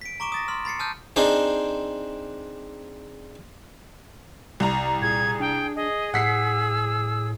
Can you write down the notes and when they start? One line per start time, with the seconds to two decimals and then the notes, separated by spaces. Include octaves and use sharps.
0.01 B6 D7
0.20 A#5 C#6 D6 D7 E7
0.32 D#6 A6 A#6
0.48 C6 F6
0.65 B5 A6 C7 C#7
0.79 A5 D#6 F6 G6
1.16 C4 D4 D#4 G#4 C5
4.60 C2 A#5
5.02 A#2 G#4 G#6
5.40 D4 G5
5.76 G#4 D#5
6.14 A2 F#5 E6 B6 C7